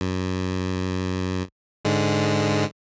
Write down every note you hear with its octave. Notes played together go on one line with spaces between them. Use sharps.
F#2
G#2 D3 G#3